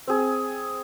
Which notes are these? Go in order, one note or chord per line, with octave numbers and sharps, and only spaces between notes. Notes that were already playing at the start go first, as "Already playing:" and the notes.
C4 G#4